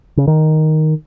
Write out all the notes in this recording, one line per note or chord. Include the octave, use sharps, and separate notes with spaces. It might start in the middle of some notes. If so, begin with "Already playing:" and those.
C#3
D#3